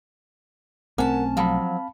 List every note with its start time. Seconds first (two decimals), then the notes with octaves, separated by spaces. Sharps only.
0.98 B1 A3 C4 C#4 A#4 F#5 A5
1.37 F3 F#3 F5 A5 B5